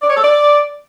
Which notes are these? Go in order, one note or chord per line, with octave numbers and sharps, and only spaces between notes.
D5
C#5
A4
D5